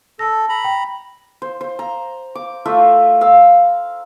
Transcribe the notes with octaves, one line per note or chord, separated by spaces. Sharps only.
A4 A5 A#6
A#5 B5
G5
C5
C5
A#5
D6
A3 F4 E5
F5 A#5 E6